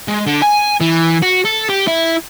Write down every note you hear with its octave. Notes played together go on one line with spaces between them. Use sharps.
G#3
D3
G#5
E3
F#4
A4
G4
E4